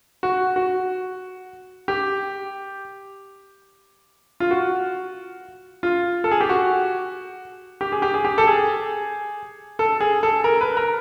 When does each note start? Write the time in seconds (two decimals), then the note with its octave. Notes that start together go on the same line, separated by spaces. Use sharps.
0.23 F#4
0.56 F#4
1.88 G4
4.40 F4
4.51 F#4
5.83 F4
6.24 A4
6.31 G#4
6.41 G4
6.49 F#4
7.81 G4
7.92 G#4
8.02 G4
8.14 G#4
8.25 G4
8.38 A4
8.47 G#4
9.79 A4
10.01 G#4
10.23 A4
10.44 A#4
10.61 B4
10.77 A#4